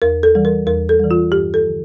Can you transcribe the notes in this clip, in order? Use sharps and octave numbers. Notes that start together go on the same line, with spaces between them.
E2 A#4
A4
E3 G3
A#4
E2 A#4
A4
E3 G3
F4
G2 G4
A4
D3 F3